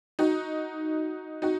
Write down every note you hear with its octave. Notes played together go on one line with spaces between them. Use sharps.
D#4 F#4
D#4 F#4